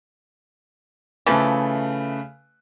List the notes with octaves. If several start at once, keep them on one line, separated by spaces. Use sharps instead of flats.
C#3 E3 F3 A3 A4 B4